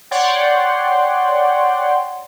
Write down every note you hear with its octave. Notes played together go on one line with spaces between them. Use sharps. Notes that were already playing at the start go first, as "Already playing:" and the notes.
C#5 D5 F#5 G5 C6